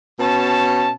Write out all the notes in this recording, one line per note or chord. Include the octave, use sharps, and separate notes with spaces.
B2 C#4 A5